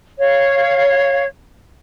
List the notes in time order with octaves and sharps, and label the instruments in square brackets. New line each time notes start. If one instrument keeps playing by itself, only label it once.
[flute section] C#5 F5